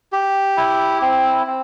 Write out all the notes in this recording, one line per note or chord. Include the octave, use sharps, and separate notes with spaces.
G4
E4
C4
C4